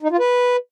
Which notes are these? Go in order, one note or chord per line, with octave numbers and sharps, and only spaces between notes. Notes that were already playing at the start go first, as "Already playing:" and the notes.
D#4
F4
B4